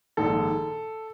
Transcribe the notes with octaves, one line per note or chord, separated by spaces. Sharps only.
A#1 G#2 D#3 A4